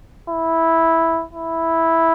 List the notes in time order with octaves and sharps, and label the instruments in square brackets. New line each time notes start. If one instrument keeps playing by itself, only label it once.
[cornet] E4
E4